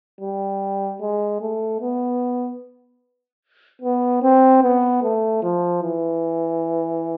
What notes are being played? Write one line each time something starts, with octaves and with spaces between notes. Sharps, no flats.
G3
G#3
A3
B3
B3
C4
B3
A3
F3
E3